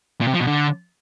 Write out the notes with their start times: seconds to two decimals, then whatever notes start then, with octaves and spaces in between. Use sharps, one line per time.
0.21 A#2
0.27 C3
0.34 F3
0.40 B2
0.47 D3